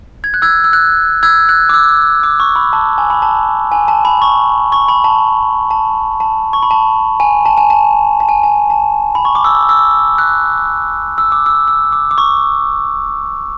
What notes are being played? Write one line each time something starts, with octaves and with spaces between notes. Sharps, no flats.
G#6
F#6
E6 G#6
E6
F#6
E6 G#6
F#6
D6
E6
D6
C#6
B5
A5
G#5
B5
A5
G#5
A5
B5
C#6
C#6
B5
A5
A5
A5
C#6
B5
A5
G#5
A5
G#5
A5
A5
G#5
G#5
A5
B5
C#6
D6
E6
E6
F#6
E6
D6
E6
E6
D6
D6
C#6